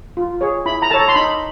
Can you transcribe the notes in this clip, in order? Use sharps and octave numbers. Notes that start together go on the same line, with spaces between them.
F4
G#4 C#5
E4 B5
A#5
A4 C#5 A5
A#5
C6
D#4 B5